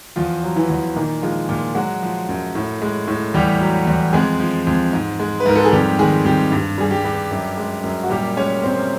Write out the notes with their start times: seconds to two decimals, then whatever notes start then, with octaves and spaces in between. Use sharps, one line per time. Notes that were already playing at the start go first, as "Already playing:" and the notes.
0.16 E2 F3 F4
0.43 F#3
0.56 E3 E4
0.70 E2
0.96 A#2 D#3 D#4
1.22 F3 G#3 F4
1.49 A#2 F3 F4
1.75 F#3 G#3 F#4
2.02 F3
2.29 F#2
2.55 A2
2.82 G#3
3.08 A2
3.34 E2 G3 G4
3.60 F#3
3.87 E2
4.13 F2 G#3 G#4
4.40 F3
4.67 F2
4.93 G#2
5.20 G#3
5.40 B4
5.46 G#2 A#4
5.56 A4
5.65 G#4
5.72 F2 G3 G4
5.99 D#3 G#3 G#4
6.25 F2 G3 G4
6.52 G2
6.78 G3 G#4
6.91 G3 G4
7.04 G2
7.31 F#2
7.57 G#3
7.84 F#2
8.03 F#4
8.10 A#2 G3 G4
8.37 G#3 C#4 C#5
8.63 A#2 C4 C5